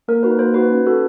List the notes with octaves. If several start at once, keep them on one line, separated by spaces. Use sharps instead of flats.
A#3 A#4
D#4 F#4 B4
A#3 C5
D#4 F#4 B4
C#4
F#4 A4